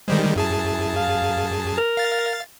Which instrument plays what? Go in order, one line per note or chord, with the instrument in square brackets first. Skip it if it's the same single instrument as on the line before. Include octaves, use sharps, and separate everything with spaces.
[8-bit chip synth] D#3 G3 G#3 [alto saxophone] C5
[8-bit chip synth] F#2 G#4 A5 [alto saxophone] E4
[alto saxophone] F5
A#4
[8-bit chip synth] F5 A6